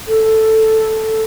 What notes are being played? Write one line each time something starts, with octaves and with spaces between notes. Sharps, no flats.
A4